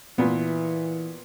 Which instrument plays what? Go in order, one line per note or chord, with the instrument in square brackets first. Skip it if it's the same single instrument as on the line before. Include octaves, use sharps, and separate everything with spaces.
[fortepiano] A#2 B3 [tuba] E3